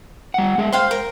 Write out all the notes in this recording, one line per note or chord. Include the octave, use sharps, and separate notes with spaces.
G3 F#5
G#3 G#4 E5
C5 F5 G5 C6
A#4